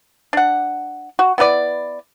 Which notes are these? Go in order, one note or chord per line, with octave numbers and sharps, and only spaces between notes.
D4 F#5
F#4
B3 E4 B4 D5